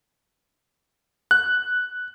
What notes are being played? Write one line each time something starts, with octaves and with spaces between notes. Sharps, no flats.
F#6